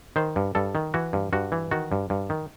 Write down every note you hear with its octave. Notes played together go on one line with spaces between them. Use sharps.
D#3 C5
G2
G2 A4
D#3
E3 F#4
G2
G2 F#4
E3
D#3 F#4
G2
G2
D#3